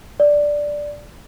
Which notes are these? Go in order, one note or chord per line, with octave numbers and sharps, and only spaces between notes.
D5